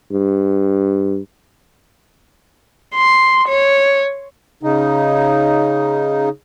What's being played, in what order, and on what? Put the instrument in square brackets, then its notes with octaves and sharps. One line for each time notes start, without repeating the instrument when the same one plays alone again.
[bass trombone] G2
[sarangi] C6
C#5
[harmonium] C#3 D#4